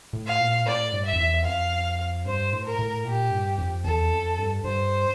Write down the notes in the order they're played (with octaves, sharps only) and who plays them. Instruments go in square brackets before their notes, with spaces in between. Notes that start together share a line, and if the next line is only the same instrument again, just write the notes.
[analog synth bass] A2
[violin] F5
[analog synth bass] A#2
[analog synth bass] A2 [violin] D5
[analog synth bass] G2
[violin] E5
[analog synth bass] F2
E2
[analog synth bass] F2 [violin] F5
[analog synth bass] G2 [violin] C5
[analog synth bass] A2
[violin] A#4
[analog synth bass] A2
[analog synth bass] A#2 [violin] G4
[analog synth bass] G2
F2
[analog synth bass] E2 [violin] A4
[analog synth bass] F2
G2
[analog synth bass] G2 [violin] C5